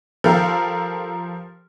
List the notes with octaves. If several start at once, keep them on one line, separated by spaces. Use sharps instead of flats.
F3 G3 G4 A4 A#4 F5